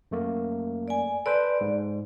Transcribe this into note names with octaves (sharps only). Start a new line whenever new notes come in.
F#2 A3 A#3
D5 G#5
A4 B4 C5 D5
G#2